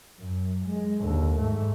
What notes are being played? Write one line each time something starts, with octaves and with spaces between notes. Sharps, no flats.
F#2
G#3
D#2 D3
G#2 A3